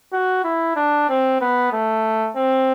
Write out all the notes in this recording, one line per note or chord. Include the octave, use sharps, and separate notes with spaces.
F#4
E4
D4
C4
B3
A3
C4